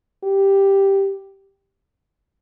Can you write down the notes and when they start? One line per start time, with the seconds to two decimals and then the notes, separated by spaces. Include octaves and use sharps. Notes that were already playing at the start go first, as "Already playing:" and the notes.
0.24 G4